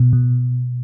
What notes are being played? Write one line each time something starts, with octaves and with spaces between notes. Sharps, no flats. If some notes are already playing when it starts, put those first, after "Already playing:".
Already playing: B2
B2